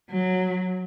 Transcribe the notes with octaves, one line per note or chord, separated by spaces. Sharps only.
F#3